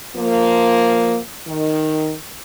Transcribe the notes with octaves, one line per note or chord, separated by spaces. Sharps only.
F3 A#3
D#3